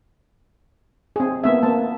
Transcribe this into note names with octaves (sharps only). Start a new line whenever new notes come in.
C4 G#4
A#3 B3 E5
A#3 B3 A5